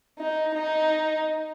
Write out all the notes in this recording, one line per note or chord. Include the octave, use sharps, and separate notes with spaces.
D#4
D#4